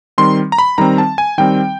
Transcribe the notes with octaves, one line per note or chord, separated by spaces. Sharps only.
D#3 G3 C4 C6
A#5
B5
D#3 G3 C4 A#5
A5
G#5
D#3 G3 C4 G5